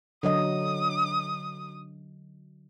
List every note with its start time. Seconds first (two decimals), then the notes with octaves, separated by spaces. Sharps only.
0.23 D3 F#3 D#5 D#6